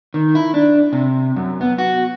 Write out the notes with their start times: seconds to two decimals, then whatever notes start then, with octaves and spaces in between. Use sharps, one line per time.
0.14 D#3
0.35 E4
0.54 D4
0.93 C3
1.36 F#2
1.61 B3
1.78 F#4